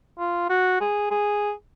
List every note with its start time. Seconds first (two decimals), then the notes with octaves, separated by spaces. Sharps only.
0.19 F4
0.49 F#4
0.81 G#4
1.11 G#4